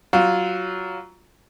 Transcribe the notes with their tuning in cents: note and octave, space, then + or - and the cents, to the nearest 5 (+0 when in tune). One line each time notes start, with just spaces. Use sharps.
F#3 +15 F4 +10